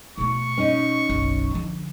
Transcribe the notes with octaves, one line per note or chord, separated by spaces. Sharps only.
B2 A3 C#6
C#4 D#4
F#1 B1
D3 F3